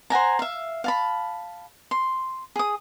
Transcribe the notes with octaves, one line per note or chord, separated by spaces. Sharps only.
C5 F#5 G#5 A#5
E5 F5
F5 A5 B5
C6
G#4 D#6